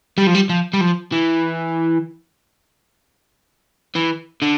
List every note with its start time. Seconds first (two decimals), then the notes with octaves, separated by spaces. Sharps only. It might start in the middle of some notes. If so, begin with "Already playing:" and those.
0.18 G3
0.27 F3
0.35 G3
0.50 F3
0.73 G3
0.81 F3
1.12 E3
3.96 E3
4.42 D3